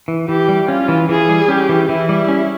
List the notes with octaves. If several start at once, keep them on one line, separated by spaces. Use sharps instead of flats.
E3
E3 G4
G3
C#4 F4
E3
E3 G#4
G3
C#4 G4
E3
E3 E4
G3
C#4